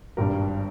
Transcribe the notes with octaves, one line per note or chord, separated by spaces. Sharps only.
G#1 G2 G3 G4 A#4